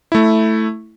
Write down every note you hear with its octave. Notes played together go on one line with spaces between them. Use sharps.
A3 E4